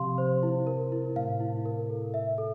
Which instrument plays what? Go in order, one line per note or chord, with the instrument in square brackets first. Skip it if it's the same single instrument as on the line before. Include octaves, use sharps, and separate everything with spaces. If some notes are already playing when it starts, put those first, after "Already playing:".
Already playing: [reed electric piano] C3 F3 [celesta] G4 F5 C6
[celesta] C5
E4
A#4
E4
[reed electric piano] A2 [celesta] F5
[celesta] E4
A#4
A4
E5
A4